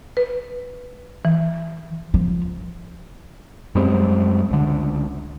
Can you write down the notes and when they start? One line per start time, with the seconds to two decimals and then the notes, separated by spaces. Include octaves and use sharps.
0.17 B4
1.25 E3
2.14 F3
3.75 F#2 G3 G#3 C4
4.51 C#2 D3